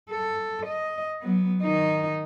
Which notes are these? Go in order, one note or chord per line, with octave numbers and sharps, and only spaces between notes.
A4
D#5
F#3 B3
D#3 D#4